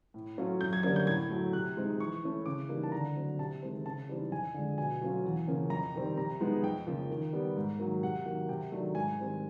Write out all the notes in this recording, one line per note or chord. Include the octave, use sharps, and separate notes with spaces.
A2
F#3 A3 C#4 F4
F#2 G6
G#6
D3 G3 A#3 C#4 G#6
G6
A2 G#6
F#3 A3
C3 F#6
F3 G#3 C4 D#4
E3 C#6
A3 C#4 E4
C#3 D6
E3 G3 A#3 D#4
A5
D3 A#5
F#3 A3 C4
C3 A5
D#3 G#3 C4
C#3 A5
E3 G3 C4 D#4
F2 G#5
D3 F3 G#3
B2 G#5
F#3 A3 C#4 F4
E2
C#3 F3 A#3 C#4
F2 A#5
C3 D#3 G3 C4
C3 A#5
F3 G#3 B3 D#4
F2 G5
C#3 F3 A#3
D#3
G3 B3
G#2
D#3 F#3 A#3
C3 F#5
D#3 F#3 A#3
C3 G5
D#3 F#3 A3 D4
G#2 G#5
D#3 G3 C4